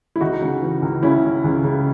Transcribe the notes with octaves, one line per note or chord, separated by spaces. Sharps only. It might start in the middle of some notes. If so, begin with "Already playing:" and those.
E4
C#2 D#4 F#4
C#3
E3
C#2
C#3 C#4 E4
C#3
C#2
C#3